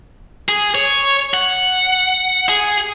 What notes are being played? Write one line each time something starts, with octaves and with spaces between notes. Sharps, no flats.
G#4
C#5
F#5
G#4